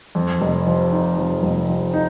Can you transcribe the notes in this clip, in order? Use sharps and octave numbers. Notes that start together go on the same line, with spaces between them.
F2
F1
F3
D#4
F2
F1
F3
D#4